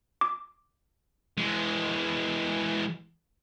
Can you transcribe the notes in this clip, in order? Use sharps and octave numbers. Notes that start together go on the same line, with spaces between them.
D6
E3 G#3